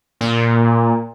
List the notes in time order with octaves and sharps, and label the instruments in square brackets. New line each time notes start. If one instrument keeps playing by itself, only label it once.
[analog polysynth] A#2